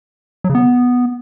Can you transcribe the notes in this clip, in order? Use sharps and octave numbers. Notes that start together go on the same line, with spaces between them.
F#3
C#3
B3